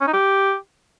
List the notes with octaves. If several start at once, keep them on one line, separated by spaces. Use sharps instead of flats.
C#4
D#4
G4